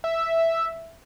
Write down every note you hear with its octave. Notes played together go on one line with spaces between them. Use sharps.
E5